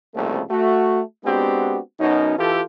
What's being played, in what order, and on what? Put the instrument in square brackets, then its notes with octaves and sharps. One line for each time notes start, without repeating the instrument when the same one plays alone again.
[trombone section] C2 F2 C#3 A3 A#3
A3 F#4
G#3 B3 C4 D4 F#4 G4
F#2 B2 C#4 D#4
E3 F4 G4 A4